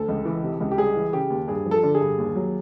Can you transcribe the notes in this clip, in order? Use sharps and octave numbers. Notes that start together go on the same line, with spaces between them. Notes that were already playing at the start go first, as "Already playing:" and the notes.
Already playing: D2 A4
C#2
E3
C3
C#2
G4
G3 G#4
E3
C#3 G4
D#2
G2 G#4
F3
A4
D3
G#4
G2
D#2
F#3